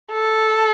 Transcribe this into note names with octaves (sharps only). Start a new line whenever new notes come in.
A4